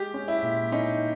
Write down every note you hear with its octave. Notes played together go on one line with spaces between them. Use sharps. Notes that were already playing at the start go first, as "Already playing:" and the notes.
Already playing: G#3 G4
C#4
E4
A#2
C#4 D#4